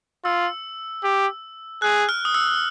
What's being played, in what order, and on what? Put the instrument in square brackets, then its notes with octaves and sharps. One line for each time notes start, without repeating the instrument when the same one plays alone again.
[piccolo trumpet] F4 [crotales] E6
[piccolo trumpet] G4
[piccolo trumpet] G#4 [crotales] F#6
[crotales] F6
D#6
E6